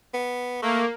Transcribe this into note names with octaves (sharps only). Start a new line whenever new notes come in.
B3
A3 A#3